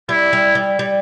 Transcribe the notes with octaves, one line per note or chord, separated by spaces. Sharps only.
G3 E4
G3
G3
G3